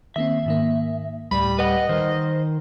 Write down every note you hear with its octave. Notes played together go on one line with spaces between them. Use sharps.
D#3 A#3 C4 E5
G#2 D#3 A#3
D2 A2 G3 B5
B4 D#5 F#5
D#3 G3 C5 F6